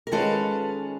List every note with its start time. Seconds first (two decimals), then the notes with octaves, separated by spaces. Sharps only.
0.07 A#4
0.12 D#3 G#3 C#4 F4 A4 B4